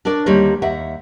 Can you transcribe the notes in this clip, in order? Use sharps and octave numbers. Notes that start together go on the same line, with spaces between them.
D4 A#4 C#5 D5
D2 D#3 G3 A#3 C5 C#5
D#2 E5 F#5